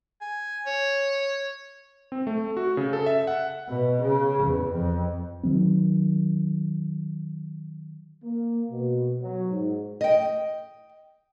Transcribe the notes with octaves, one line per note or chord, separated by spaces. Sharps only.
G#5
C#5
C4
A3
F#4
C#3
A4
E5
F#5
B2
C#3
E2
F2
D#3 F#3 C4
A#3
B2
F#3
G#2
D#5 G5